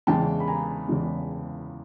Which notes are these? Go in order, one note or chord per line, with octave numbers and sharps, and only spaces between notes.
E2 C#3 E3 G#3 G5 A5
B5
G#5 A#5
E2 C#3 E3 G#3